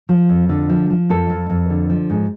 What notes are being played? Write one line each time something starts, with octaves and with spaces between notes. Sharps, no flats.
F3
F2
D3
F3
F3
F2 A4
F2
F2
D3
F3
G#2